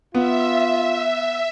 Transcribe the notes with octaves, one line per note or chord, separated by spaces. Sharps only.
B3 F4 E5